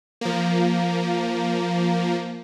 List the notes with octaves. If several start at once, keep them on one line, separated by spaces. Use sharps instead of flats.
F3 A#3